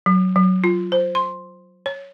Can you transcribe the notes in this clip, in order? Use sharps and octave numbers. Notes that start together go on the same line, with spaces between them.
F#3
F#3
F4
C5
C6
C#5